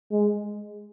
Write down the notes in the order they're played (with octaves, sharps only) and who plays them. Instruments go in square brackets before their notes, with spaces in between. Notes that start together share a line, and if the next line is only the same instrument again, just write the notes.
[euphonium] G#3